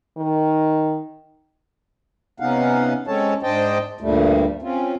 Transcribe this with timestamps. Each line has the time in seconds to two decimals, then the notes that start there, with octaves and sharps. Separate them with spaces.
0.17 D#3
2.40 C3 B3 C#4 D#4 F5 F#5
3.07 G#3 C4 C#4 A4 C#5 A5
3.43 G#2 D4 C5 D#5 G5 A5
4.01 D2 G2 A#2 G3 A3
4.62 C4 C#4 F4